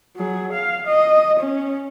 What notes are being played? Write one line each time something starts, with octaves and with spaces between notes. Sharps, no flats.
F#3 G#4
F5
D#5
C#4